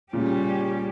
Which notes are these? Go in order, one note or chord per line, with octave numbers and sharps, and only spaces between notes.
A#2 C#3 G3 C#4 G4